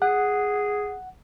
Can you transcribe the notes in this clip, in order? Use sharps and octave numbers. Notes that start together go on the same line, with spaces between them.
G#4 F#5